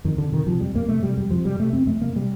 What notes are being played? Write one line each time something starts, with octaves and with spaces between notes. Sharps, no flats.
F2 D#3
F2 D3
C3 D#3
C3 F3
F2 G3
F2 A#3
C3 A3
C3 G3
F2 G3
F2 F3
C3 G3
C3 A3
F2 C4
F2 A3
C3 A#3
C3 G3